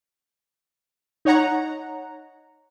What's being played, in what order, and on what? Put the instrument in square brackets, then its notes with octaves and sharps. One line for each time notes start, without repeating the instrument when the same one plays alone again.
[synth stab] D#4 C#5 F#5 A#5